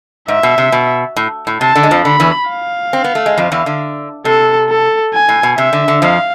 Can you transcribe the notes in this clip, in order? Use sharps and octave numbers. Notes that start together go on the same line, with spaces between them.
G#2 E5
B2
C3
B2
A2
A2
C3 A5
D3
G#3
F2 F3
D3 B5
E2 E3
F5
C4
B3
A3
G#3
F2 F3
E2 E3
D3
C3 A4
A4
G#5
A2
B2
C3 E5
D3
D3
F2 F3 F5